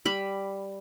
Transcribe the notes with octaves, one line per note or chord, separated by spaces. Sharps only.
G3 B5